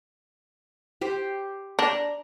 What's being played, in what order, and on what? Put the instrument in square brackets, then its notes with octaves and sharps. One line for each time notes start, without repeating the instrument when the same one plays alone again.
[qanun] G4 C5 G5
[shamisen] D4 [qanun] A#5